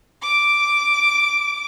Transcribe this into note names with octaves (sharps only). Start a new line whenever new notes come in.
D6 D7